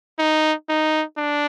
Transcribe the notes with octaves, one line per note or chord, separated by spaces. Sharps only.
D#4
D#4
D4